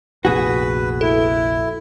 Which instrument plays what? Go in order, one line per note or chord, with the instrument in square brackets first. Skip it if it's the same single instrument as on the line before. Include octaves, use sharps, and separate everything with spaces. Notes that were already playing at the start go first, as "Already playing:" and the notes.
[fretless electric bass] F1 A#1 B3 [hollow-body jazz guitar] F#4 G#4 [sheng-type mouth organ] B4
[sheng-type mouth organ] E4 [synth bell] A4